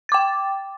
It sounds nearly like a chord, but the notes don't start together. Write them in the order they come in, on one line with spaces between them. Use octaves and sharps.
A6 D6 G5